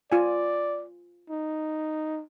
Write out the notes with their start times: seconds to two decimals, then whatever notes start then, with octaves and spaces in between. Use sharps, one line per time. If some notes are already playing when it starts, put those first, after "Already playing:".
0.12 F4 D5 G#5
1.30 D#4